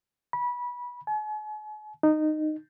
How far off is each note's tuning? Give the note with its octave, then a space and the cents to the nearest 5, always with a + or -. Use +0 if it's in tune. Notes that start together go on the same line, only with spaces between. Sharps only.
B5 -20
G#5 +45
D#4 -15